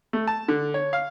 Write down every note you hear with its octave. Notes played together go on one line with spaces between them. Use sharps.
A3
A5
D3
C#5
F5